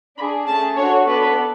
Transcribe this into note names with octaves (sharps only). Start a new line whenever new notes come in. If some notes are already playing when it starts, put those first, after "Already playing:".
D4 G#4 B5
A3 C#4 G#4 A5
D4 F#4 A4 C#5
B3 D4 A4 B4